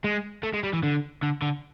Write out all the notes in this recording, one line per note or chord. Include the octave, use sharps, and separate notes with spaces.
G#3
A3
G#3
G3
E3
D3
D3
D3